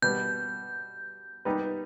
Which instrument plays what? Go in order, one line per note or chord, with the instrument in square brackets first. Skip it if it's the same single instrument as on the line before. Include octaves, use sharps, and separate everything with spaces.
[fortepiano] B2 G3 B3 [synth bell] G6
[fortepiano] G3 B3 D#4 G4 B4